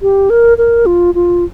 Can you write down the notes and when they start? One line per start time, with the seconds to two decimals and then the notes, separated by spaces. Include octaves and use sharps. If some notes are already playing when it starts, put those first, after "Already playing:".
0.02 G4
0.30 A#4
0.58 A#4
0.86 F4
1.15 F4